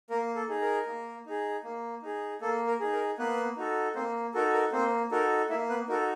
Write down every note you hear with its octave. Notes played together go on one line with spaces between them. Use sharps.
A#3 A#4
A4
D#4 G#4
A#4
A#3
D#4 G#4
A#3
D#4 G#4
A#3 A4
A#4
D#4 G#4
A#4
A#3 B3 B4
D#4 F#4 A4
A#3 C4 C5
D#4 F#4 A4 A#4
A#4
A#3 C4 C5
D#4 F#4 A4 A#4
A#3 E4 E5
B3 B4
D#4 F#4 A4 A#4